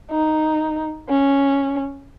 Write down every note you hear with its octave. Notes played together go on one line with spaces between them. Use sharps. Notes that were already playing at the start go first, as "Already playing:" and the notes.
D#4
C#4